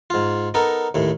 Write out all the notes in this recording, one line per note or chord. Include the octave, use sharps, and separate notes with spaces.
G#2 F4
B3 D#4 A4 A#4
D#2 A2